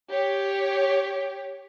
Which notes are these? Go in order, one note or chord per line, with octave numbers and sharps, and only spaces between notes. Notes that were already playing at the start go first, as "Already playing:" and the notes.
G4 C#5